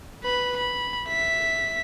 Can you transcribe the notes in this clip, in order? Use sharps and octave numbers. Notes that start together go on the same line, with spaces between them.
B4 B5
B5
E5 B6